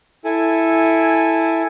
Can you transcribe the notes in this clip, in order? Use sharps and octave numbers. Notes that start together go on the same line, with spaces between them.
E4 A4 G#5